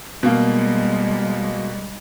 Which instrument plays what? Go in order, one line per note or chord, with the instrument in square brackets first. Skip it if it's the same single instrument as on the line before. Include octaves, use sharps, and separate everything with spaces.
[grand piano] B2 A#3 [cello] G3 G#3